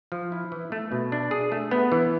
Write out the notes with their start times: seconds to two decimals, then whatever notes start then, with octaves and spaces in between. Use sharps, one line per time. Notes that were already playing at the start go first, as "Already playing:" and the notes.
0.12 F3
0.32 E4
0.52 E3
0.72 A3
0.92 B2
1.12 D4
1.31 G#4
1.52 A3
1.71 B3
1.92 E3